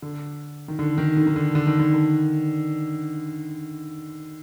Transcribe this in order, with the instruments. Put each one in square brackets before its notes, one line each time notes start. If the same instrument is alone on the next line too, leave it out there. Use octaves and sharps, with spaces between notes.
[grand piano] D3
D#3
D3
D#3
D3
D#3
D3
D3
D#3
D3
D#3